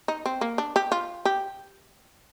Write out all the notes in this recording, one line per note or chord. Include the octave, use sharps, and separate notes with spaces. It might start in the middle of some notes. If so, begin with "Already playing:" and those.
D#4
C4
A#3
D4
G4
F4
G4